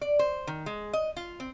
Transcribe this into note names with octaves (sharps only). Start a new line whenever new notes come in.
D5
C5
D#3
G#3
D#5
F4
C4